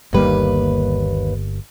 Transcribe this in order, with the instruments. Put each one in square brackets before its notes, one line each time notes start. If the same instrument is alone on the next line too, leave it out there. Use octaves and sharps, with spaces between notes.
[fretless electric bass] G1 G3 A#3 [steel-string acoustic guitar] D#2 B4